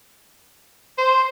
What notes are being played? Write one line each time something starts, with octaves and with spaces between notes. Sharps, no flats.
C5